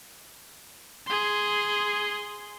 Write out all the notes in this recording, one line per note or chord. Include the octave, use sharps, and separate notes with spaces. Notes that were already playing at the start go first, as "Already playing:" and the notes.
G#4 C6